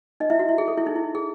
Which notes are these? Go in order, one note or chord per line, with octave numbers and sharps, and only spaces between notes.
D#4 D#5
E4 E5
F#4
E4
G#4
A4
E4
D#4
E4
G#4